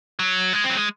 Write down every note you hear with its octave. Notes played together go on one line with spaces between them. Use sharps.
F#3
G#3
C4
F#3
G#3